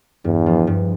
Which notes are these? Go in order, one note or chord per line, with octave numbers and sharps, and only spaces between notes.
E2 G2
F3
G2